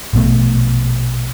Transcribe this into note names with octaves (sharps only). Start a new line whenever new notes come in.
A#1 B2 A3